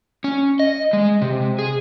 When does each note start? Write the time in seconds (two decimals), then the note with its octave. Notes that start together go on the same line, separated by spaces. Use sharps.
0.24 C#4
0.59 D#5
0.93 G#3
1.22 C3
1.59 G#4